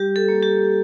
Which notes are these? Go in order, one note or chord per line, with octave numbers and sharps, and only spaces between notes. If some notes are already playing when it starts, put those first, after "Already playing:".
Already playing: G3 G4
A4
A#3
G4